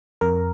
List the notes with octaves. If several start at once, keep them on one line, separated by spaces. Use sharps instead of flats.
F2 A#4